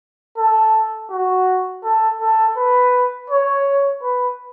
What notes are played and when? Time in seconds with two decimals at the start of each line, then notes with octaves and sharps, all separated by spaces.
0.38 A4
1.10 F#4
1.84 A4
2.21 A4
2.57 B4
3.30 C#5
4.03 B4